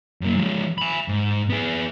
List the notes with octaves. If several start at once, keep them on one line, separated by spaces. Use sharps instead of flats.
F#2 A#3
F3 G#3
G#5 B5
G#2
B3 G#4